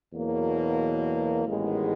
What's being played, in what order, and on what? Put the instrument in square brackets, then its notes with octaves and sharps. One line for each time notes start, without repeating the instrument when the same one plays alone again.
[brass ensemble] E2 B2 F#3 A#3
A1 G#2 D#3 G#3 B3